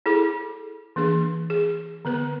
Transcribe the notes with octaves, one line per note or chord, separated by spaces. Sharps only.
E4 G#4 A4 D6
E3 A#3 D4 G#4
G#4
D3 B3 B4